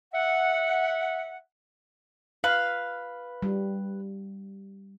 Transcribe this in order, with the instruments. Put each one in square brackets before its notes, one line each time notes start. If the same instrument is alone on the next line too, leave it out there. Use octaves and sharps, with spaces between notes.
[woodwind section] E5 F#5
[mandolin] B4 [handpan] F5
[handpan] G3